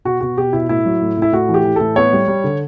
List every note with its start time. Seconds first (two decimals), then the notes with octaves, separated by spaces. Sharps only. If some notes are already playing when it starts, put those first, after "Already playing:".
0.05 B2 F#4
0.21 B2 F#4
0.37 B2 G4
0.53 B2 E4
0.69 A2 E4
0.86 F#3
1.01 A2
1.17 A2 E4
1.32 A2 F#4
1.49 E3
1.54 G4
1.65 E3
1.76 A2 A4
1.96 B3 C#5
2.13 G3
2.28 G3
2.44 D3